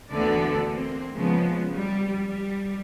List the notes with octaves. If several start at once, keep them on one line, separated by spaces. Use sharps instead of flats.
D2 D3 E3 B3 A4 D5
A#3 C4
C#3 F3 G#3 B3
G3
G3